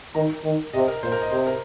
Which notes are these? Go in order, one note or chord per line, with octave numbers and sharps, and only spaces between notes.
D#3 A#5
D#3
C3 D#5
A#4
A#2 C5
A#4
D#5
C3 C5
A#4